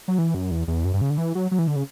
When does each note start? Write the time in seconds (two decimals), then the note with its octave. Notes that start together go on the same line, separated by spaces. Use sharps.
0.08 F#3
0.18 E3
0.35 F#2
0.51 E2
0.68 E2
0.85 F#2
0.94 G2
1.01 C#3
1.10 D3
1.18 E3
1.35 F#3
1.51 F#3
1.59 E3
1.67 D3
1.76 C#3